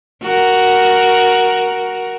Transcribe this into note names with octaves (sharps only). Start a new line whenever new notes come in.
F#4 A#4